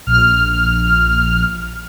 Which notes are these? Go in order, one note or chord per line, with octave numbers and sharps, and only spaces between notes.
A#1 F6